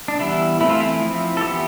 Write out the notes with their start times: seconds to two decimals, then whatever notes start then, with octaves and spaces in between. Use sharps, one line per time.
0.08 D4
0.19 E3 G3 B3 E4
0.60 E3 A3 C4 E4
0.70 F4
0.80 E4
1.01 F3 C4
1.37 A4
1.41 E3 B3 G4